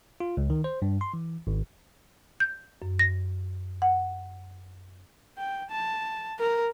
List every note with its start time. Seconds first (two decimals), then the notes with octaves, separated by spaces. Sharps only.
0.20 F4
0.37 C#2
0.50 D#3
0.64 C5
0.82 G2
1.01 C6
1.14 E3
1.47 G#1
2.40 G6
2.82 F#2
2.99 A#6
3.82 F#5
5.38 G5
5.71 A5
6.40 A#4